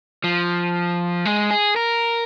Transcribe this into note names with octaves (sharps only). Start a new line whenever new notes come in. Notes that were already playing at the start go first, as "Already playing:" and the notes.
F3
G#3
G#4
A#4